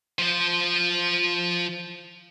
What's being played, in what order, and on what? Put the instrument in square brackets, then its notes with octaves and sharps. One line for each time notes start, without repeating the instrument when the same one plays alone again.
[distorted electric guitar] F3 C5